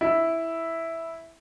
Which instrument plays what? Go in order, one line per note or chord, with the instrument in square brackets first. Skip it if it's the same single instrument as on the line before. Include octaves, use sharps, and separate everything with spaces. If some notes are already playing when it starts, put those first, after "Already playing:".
[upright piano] E4